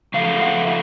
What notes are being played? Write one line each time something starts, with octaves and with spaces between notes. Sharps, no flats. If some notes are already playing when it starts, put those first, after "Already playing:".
C#3 F3 A3 F5
E5 F#5
E5